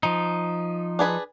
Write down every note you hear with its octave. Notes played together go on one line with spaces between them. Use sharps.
F3 D#4
D4 G#4 B4